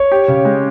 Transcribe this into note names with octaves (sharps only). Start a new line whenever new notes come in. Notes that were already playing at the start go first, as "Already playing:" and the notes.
Already playing: C#5
G4
C#3
G#3